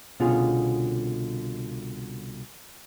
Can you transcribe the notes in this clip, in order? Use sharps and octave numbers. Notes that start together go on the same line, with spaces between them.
C2 B2 D3 C#4 F4 G#4